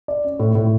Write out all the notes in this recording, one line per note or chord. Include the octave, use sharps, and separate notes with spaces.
D5
C#4
A2
A2